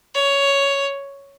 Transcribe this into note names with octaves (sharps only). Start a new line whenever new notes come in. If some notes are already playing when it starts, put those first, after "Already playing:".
C#5